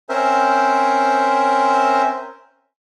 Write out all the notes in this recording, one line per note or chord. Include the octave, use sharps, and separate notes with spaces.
C4 C#4 A#4 C5 E5